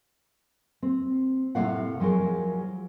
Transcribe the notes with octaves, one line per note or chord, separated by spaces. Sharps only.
C4
A2 C3 D#3 A#3 F5 F#5
F3 F#3 G#3 A#4